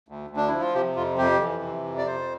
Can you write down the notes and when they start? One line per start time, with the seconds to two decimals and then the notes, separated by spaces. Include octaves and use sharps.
0.08 D2
0.30 D2
0.36 D4
0.48 F3 E4
0.61 F4
0.75 C3 G4
0.96 F2 F4
1.18 F2 G4
1.40 E3
1.63 C3
1.85 F2
1.98 D5
2.07 F2 C5